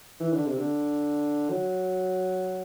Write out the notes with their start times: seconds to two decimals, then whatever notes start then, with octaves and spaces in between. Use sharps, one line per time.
0.20 E3
0.33 D3
0.46 C3
0.58 D3
1.50 F#3